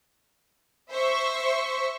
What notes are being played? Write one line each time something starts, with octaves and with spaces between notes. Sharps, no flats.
C5 E5 C#6